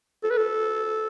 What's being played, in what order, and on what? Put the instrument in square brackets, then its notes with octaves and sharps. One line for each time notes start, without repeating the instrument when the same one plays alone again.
[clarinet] A4
B4
A4